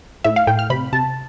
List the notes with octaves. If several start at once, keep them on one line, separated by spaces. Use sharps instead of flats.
A2 E5
F5
A2 G5
F6
C3 B5
C3 A5